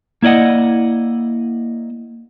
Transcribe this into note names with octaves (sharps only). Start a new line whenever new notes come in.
A#3 E4 D5 D#5 F#5